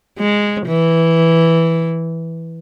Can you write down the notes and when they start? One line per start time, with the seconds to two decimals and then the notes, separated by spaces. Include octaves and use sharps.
0.19 G#3
0.67 E3